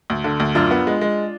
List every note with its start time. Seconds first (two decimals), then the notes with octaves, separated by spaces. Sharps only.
0.10 D2
0.24 D3
0.40 D2
0.55 F#2 D4 F4
0.71 B3
0.87 G#3
1.01 G#3